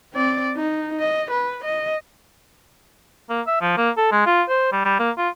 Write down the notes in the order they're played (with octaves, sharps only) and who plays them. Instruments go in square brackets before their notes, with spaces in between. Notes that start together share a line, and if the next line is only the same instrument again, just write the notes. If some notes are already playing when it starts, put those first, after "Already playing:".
[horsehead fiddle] C4 D5
D#4
D#5
B4
D#5
[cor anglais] A#3
E5
F3
A#3
A4
G#3
F4
C5
G3
G3
A#3
F4